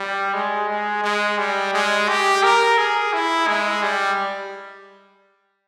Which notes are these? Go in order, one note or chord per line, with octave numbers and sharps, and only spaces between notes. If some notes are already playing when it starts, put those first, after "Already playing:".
Already playing: G3
G#3
G#3
G#3
G3
G#3
G4
A#4
G#4
E4
G#3
G3